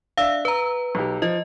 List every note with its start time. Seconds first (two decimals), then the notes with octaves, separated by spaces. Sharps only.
0.17 D4 E5 F5 E6
0.45 B4 A#5 E6
0.95 B1 G4
1.22 F3 D#5